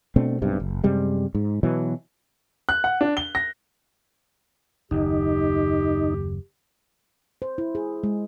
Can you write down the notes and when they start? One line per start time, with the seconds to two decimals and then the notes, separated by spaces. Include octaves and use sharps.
0.16 B2 A3 C4 D4
0.42 B1 G2 C3
0.60 F#1
0.84 F#2 C3 G3 G#3
1.35 G#2
1.63 B2 E3 F#3
2.69 F#6
2.84 F#5
3.01 D4
3.17 G7
3.35 A#6
4.91 F#1 D#2 D#4 G4
7.42 C5
7.58 E4
7.75 G#4
8.04 G#3